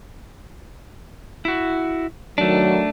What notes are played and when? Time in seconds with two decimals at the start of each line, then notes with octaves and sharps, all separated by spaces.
1.45 E4 F#4
2.38 D#3 F#3 A3 D4